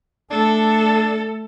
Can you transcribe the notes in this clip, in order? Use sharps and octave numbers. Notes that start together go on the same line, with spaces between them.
A3 D4 A4